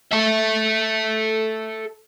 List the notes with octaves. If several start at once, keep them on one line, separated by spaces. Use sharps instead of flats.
A4 E5